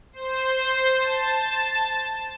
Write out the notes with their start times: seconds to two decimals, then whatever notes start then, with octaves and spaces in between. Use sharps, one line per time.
0.13 C5
0.98 A5